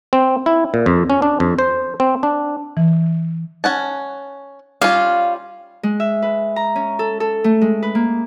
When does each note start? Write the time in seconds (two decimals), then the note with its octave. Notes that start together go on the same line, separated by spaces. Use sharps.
0.13 C4
0.46 E4
0.74 A#2
0.86 F2
1.10 C#4
1.22 D4
1.40 F2
1.59 C5
2.00 C4
2.23 D4
2.77 E3
3.64 C#4 F#5 A5
4.81 G3 C#4 F4 F5
5.83 G#3
6.00 E5
6.22 B4
6.56 A#5
6.76 C#4
6.99 A4
7.20 A4
7.44 A3
7.61 G#3
7.82 B4
7.95 A#3